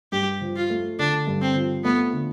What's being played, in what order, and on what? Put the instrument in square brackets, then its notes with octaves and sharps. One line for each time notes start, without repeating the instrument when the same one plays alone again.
[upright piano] G2 [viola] G4
[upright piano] F3
[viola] F4
[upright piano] A3
[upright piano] D3 [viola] D4
[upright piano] G2
[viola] C4
[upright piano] F3
[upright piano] A3 [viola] B3
[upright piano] D3